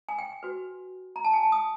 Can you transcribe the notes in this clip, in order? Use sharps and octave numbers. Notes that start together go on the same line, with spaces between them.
G#5
G5
F#4 B4
A#5
A5
G#5
A5
D#6